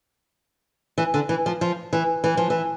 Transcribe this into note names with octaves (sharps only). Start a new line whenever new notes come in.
E3
D3
E3
F3
F3
E3
E3
F3
E3